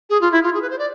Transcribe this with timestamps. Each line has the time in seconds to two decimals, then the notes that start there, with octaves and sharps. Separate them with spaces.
0.10 G#4
0.21 F4
0.32 E4
0.43 F4
0.54 G#4
0.62 B4
0.70 C5
0.79 D5